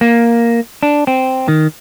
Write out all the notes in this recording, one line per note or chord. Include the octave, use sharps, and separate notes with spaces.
A#3
D4
C4
D#3